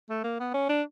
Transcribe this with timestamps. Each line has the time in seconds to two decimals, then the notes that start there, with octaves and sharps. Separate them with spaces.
0.10 A3
0.24 A#3
0.40 B3
0.54 C#4
0.69 D4